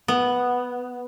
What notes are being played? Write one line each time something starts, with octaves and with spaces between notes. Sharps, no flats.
B3